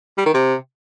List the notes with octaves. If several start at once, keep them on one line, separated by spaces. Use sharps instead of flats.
G3
D#3
C3